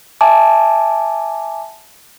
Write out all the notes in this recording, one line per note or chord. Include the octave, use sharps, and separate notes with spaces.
E5 G#5 A5 D6